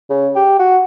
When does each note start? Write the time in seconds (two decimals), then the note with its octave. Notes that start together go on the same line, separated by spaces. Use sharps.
0.10 C#3
0.35 G4
0.59 F#4